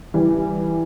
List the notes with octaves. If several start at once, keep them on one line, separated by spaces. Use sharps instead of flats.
E3 G3